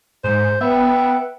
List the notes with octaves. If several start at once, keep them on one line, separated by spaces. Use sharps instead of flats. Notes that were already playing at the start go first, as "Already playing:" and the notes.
G#2 C5
B3 B4 E5 F#5 G5